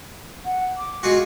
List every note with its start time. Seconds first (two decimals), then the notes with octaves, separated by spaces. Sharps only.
0.45 F#5
0.76 D6
1.03 G#3 F4 F#4